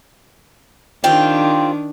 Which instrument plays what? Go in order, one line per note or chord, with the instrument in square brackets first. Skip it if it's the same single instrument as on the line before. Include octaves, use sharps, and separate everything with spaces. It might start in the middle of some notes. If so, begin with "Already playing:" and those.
[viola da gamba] D#3 D4 [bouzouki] C4 F4 G4